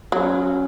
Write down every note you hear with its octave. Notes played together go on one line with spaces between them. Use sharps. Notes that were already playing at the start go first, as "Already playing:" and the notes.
F#3 C#4